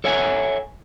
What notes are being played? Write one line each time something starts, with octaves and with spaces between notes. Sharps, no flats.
A4 C#5 E5 F#5 G#5